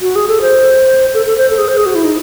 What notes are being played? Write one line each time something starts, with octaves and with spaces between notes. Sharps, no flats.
F#4
G#4
A4
C5
A4
A4
C5
A4
G#4
C5
G#4
F#4
E4
D#4